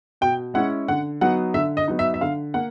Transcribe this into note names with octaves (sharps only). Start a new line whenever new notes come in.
B2 G5
G#3 C#4 E4 F#5
D3 F#5
F#3 B3 D#4 F#5
D3 E5
D#5
F#3 B3 D#4
E5
E5
D3 F5
A#3 F#5